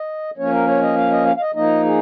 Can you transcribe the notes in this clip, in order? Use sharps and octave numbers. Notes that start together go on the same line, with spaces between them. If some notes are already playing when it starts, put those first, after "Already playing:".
Already playing: D#5
F3 A#3 C#4 C#5
A#4
C#5
D#5
F5
D#5
F5
F5
D#5
F3 A#3 D#4 D#5
G#4